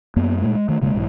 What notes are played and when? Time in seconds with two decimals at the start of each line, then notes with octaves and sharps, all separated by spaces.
0.16 F#2 A#3 B3
0.42 A#2 G#3 A3
0.55 G#3
0.68 D#3 A3
0.81 E1 C#3 G#3 A#3
0.94 B1 G#2 E3